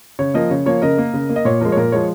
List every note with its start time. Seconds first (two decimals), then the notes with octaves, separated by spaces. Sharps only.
0.19 C#3 C#5
0.34 F3 A#3 A#4 D#5
0.50 C#3 C#5
0.66 F3 A#3 C#5
0.82 C#3 A#4 D#5
0.98 A#3
1.14 C#3
1.30 A#3
1.36 D#5
1.45 A#2 C#5
1.60 F3 G#3 A#4
1.72 C#5
1.77 A#2 A#4
1.92 F3 G#3 C#5